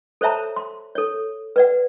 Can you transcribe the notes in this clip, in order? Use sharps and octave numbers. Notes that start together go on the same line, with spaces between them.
A4 C5 C#5 E5 A5 A#5
C6
A4 C#5
B4 D5 F#5